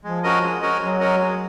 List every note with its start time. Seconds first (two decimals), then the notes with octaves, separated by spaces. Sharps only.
0.04 F3 G#3
0.23 C#4 F#4 A#4 D#5
0.42 G#3
0.62 C#4 F#4 A#4 D#5
0.81 F#3 G#3
1.00 C#4 F#4 A#4 D#5
1.19 G#3